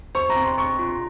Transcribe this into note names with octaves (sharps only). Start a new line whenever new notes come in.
C5 C#6
A#5
C4
C6
C4 C#6
F4